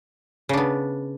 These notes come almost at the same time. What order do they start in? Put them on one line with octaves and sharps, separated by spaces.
C#3 D4 B3